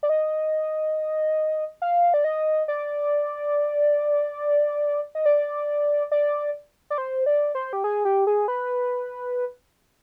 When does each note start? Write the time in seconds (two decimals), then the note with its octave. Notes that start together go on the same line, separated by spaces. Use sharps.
0.03 D5
0.09 D#5
1.82 F5
2.14 D5
2.24 D#5
2.68 D5
5.15 D#5
5.26 D5
6.12 D5
6.90 D5
6.98 C5
7.26 D5
7.55 C5
7.73 G4
7.84 G#4
8.05 G4
8.27 G#4
8.48 B4